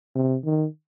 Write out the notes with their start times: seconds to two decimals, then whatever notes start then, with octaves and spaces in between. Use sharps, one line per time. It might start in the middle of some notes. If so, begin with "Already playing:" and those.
0.15 C3
0.45 D#3